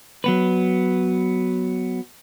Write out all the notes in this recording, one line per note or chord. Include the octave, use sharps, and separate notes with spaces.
F#3 B3 B4